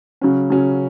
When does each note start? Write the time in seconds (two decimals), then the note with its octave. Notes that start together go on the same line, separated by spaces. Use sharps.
0.21 C#3 F#3 C#4
0.50 C#3 F#3 C#4